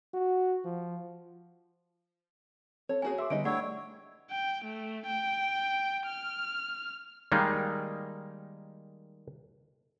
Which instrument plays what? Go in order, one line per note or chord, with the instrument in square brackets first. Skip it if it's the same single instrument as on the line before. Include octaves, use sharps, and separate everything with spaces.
[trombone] F#4
F3
[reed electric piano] C4 A4 [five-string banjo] C#5
[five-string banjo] A#3 F#4 G#4 [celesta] C#5 G#5
[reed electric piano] E5 C6 D6 [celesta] E6
[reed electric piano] D3 G3 [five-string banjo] B3 D#4 D#5 [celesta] D7
[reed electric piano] A3 D4 [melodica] E4 C#5 [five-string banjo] G4 [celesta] D5 F#5
[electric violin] G5
A3
G5
F6
[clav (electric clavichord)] D#3 G3 G#3 A#3 D#4